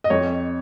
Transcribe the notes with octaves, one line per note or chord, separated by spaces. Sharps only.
D#5
F2 C#5